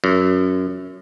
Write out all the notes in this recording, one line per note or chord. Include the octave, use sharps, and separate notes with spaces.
F#2